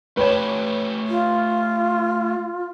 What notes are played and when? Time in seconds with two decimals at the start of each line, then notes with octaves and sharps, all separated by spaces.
0.17 A3 G4 B4 C#5 A5
1.08 F4